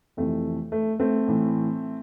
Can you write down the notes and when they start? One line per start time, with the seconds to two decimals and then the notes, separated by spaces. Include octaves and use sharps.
0.17 F2 C3 E3 A3
0.72 A3
1.00 A3 C4
1.27 A2 E3